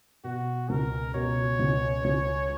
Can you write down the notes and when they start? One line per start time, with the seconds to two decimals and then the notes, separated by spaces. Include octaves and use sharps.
0.24 B2 F#4
0.69 C#2 A#4
1.14 B2 C#5
1.59 C#2
2.04 C#2